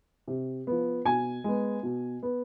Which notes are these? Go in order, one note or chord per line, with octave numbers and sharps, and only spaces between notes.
C3
F3 B3
B2 G#5
G#3 B3
B2
B3